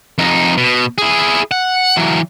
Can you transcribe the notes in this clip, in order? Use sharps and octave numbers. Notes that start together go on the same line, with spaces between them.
F2 D#4
B2
E4 G#4
F#5
E3 F#3